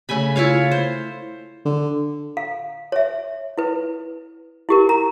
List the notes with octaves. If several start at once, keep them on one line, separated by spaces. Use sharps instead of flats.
C#3 A3 G#5 B5
E4 F4 C#5 F5
C5
D3
F5
C#5 E5
E4 B4
E4 G4 A#4
A#5